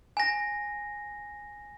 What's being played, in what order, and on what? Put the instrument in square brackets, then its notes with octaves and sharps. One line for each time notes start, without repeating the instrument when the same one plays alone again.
[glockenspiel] G#5 A#6